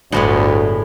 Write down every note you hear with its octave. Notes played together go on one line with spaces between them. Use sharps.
G1 D2 A2 G#3 B3